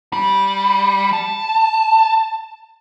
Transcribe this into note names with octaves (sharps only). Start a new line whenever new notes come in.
G3
A5